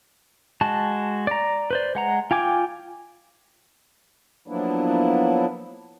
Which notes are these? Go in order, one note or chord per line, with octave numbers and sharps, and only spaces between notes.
G#3 F#4 A5
D5 A#5
B4 C5 D5
G#3 F#5 A#5
F4 G5 G#5 D6
F3 F#3 A#3 B3 D4 E4